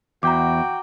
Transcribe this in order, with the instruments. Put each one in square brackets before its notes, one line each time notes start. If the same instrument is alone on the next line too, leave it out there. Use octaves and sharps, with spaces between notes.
[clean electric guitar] E2 [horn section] F#4 G5 [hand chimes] A#5 D6